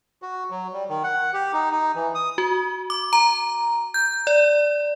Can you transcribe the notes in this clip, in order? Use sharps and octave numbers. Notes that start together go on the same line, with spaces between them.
F#4
F#3
G3
D#3
F#5
G4
D#4
D#4
E3
D#6
F#4
D6
A#5
G6
D5